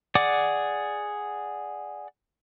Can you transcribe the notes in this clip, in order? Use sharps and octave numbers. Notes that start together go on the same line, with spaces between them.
G#4 D5 F#5 D6